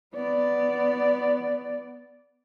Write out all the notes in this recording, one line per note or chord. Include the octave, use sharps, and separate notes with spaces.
B3 D5